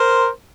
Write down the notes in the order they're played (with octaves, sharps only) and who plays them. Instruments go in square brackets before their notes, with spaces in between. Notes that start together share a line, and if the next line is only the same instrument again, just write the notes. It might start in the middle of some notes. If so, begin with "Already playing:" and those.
Already playing: [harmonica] A#4 C5